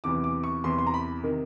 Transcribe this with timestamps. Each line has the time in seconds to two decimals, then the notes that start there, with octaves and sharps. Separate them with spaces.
0.04 E2 C3 E3 D6
0.24 D6
0.44 C#6
0.64 E2 C3 E3 C6
0.78 C6
0.87 A#5
0.94 B5
1.23 C3 D#3